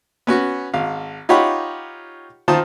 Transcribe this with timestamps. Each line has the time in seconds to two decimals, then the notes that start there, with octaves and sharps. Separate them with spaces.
0.27 B3 C#4 F#4
0.74 G#1 F5
1.29 D#4 F4 G4 C#5 F#5 B5
2.48 D#3 F4 C5 A5 D#6